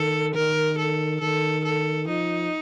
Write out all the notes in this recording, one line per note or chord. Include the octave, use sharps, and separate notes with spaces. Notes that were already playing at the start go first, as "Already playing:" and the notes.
Already playing: D#3 A4
D#3 A#4
A4
D#3 A4
A4
F3 D#4